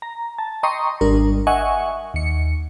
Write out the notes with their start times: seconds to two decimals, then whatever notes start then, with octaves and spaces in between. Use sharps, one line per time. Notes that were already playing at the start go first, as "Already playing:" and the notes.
0.02 A#5
0.38 A5
0.63 D#5 G5 A#5 C6 C#6 D#6
1.01 G#1 G3 D4 A#4
1.47 D#5 E5 F#5 G#5 C#6
2.14 D#2 C#7